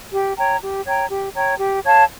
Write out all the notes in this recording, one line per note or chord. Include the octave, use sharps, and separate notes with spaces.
G4
C#5 G5 A#5
G4
C#5 G5 A#5
G4
C#5 G5 A#5
G4
C#5 F5 A5